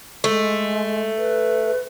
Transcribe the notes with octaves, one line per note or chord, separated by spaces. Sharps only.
G#3 A3
B4